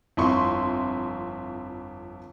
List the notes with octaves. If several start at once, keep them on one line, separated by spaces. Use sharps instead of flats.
G1 F2 E4 C6 C#6